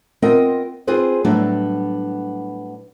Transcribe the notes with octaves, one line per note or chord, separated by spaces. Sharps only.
B3 C4 F4 A#4 D#5 G5
C4 F4 G#4 B4 C5
A2 F#3 G3 B3 D4